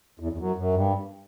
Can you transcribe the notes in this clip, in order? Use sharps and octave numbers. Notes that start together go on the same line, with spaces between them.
E2
E2
F#2
F#2
G2